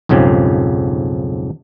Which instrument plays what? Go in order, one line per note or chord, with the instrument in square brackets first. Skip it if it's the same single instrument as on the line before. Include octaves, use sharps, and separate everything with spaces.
[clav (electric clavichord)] B1 F2 G#2 C#3 F3 G4